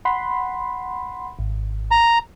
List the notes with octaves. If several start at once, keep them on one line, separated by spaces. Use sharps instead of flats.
F#5 B5 C6
G#1
A#5